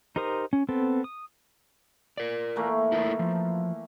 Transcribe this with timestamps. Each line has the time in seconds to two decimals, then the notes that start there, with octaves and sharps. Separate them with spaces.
0.16 D#4 G4 A#4 C5 D#6
0.53 C#4
0.69 B3 C4 A4
1.04 D#6
2.17 A#4 D5
2.56 E3 A3 A#3
2.92 E4 A4 A#4
3.19 F3